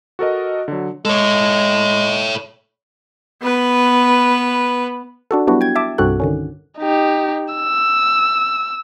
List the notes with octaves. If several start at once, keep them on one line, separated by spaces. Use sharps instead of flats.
F#4 A4 A#4 D#5
D3 F#3
G#3 A4 C#5
B3 B4
D4 F#4 A4
F#3 G3 B3 D4 E4 F#4
G5 G#6
E5 A5 D6
C2 G2 C4 F#4 A4 F#6
D3 D#3 C#4
D#4 G4
E6